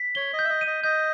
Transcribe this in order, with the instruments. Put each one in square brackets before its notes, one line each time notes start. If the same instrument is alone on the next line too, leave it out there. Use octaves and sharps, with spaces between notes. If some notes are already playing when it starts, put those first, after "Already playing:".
Already playing: [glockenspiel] B6
[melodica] C#5 [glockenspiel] G7
[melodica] D#5
[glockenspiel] G6
[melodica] E5
D#5
[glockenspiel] D#7
[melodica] D#5
[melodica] D#5 [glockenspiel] G6